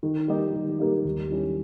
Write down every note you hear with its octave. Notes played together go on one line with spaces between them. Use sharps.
D#3
G3 A#3 D#4 G4
D#3
G3 A#3 D#4 G4
D#2
D#3 G3 C#4 E4